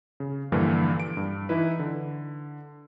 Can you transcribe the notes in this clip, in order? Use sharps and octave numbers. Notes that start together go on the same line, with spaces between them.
C#3
G2 A#2 D3 E3 F3
D7
G2
E3 D#4 E4 B4
D3